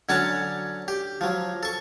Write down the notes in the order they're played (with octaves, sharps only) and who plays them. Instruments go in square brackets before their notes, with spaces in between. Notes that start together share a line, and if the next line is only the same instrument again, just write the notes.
[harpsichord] D3 F#3 C#4 C#5 F#5 A5
G4
F3 F#3
A4 C#6